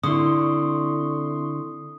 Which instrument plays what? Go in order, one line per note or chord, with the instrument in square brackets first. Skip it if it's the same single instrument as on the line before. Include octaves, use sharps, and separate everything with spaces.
[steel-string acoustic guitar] D3 [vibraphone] C4 A4 D5 [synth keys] E4 C6 C#6 [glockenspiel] D#6